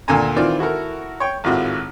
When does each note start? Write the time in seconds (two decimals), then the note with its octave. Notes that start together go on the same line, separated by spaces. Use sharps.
0.08 D2 A#2 D3 A4 G#5 A#5
0.36 D#3 E3 C4 F4 D5
0.59 E4 F#4 A4 A#4
1.20 C#5 G5
1.44 G#1 A2 F4 F#4